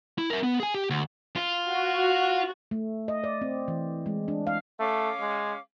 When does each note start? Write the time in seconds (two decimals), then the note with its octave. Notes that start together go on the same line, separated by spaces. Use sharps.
0.18 E4
0.30 A#4 E5
0.43 B3
0.60 G#4 G#5
0.74 G4
0.90 D2
1.36 F4
1.70 F#4
2.71 A3
3.08 D#5
3.24 D5
3.41 C4
3.68 E3
4.06 G#3
4.28 D4
4.47 F5
4.79 A3 C#4 F5 D6
5.21 G#3